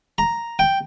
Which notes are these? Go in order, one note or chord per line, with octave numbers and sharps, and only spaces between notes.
A#5
G5